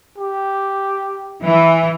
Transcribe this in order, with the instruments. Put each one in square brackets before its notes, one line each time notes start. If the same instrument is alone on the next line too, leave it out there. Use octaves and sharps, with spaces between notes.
[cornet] G4
[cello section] E3